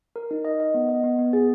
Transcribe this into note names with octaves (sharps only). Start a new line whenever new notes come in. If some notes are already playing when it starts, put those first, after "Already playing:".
A#4
D#4
D#5
D#5
B3
D#5
B3
B3
G#4